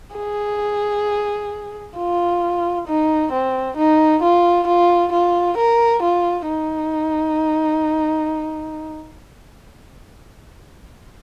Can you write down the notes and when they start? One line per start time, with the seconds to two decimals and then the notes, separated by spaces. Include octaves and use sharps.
0.16 G#4
1.98 F4
2.87 D#4
3.32 C4
3.77 D#4
4.22 F4
4.67 F4
5.12 F4
5.58 A#4
6.03 F4
6.48 D#4